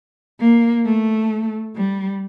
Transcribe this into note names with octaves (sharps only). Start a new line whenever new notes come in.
A#3
A3
G3